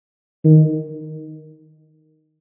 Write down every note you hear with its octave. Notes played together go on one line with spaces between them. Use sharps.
D#3